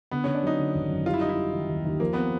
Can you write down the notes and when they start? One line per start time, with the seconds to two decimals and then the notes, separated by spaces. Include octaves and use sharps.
0.11 D3 B3
0.24 D3 C#4
0.35 D4
0.43 F#3 D#4
0.59 D3
0.75 G#1
0.90 F#2
1.06 G3 F4
1.14 E4
1.21 G3 D#4
1.29 E4
1.37 G3
1.53 D#3
1.69 D#2
1.85 D#2
2.00 F3 A#3
2.13 B3 C4